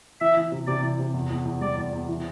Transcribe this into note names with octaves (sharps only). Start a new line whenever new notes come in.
E3 E5
E3
C3
C3 D5
E3
C3
E2
E2
E2
G3 D5
E2
E2
E3